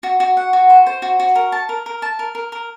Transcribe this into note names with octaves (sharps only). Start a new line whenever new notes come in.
F#4
F#4
F#5
F#4
C5
C5
F#4
F#4
A#4
A5
A#4
A#4
A5
A#4
A#4
A#4